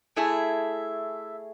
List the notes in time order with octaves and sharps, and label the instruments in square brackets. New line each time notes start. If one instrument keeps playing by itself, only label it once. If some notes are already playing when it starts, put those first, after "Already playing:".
[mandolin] A3 E4 G#4 E5